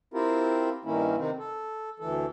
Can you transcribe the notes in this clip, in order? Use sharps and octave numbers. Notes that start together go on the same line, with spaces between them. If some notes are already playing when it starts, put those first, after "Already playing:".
C4 E4 F4 G4 A#4
G2 D#3 A#3 C#4 E4
C3 D#3 C4
A4
D2 E3 A4